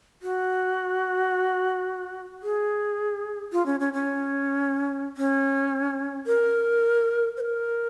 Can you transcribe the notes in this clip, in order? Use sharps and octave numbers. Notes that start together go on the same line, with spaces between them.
F#4
G#4
F4
C#4
C#4
C#4
C#4
A#4
C5
A#4